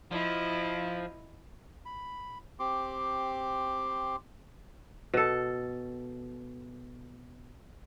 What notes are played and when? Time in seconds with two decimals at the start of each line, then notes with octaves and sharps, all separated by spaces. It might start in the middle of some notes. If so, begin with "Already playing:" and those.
0.11 F3 E4 D#5
1.86 B5
2.59 C4 G4 C6 D6
5.14 B2 A4